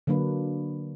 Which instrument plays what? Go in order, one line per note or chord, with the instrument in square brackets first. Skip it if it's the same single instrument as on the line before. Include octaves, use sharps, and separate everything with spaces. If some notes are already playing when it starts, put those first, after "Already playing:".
[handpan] D3 F#3 A#3 D4 B4